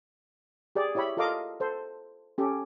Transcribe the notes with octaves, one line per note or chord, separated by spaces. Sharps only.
G4 G#4 D5
E4 G4 C#5 E5 B5
F4 A4 A#4 D#5 F5 D6
A4 C5
C#4 G4 A4